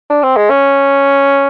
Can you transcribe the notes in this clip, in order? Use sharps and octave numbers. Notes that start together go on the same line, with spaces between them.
D4
C4
G#3
C#4